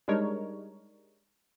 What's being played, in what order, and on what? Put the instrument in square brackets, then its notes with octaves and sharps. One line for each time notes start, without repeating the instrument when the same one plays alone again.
[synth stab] G3 G#3 D4 D#4 A#4 C#5